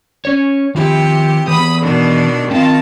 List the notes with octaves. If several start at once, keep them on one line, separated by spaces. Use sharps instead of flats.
C#4 C#5
C3 D#3 F3 E4 G4
E3 B3 B5 D#6
B2 D#3 D4
D#3 C4 F4 A5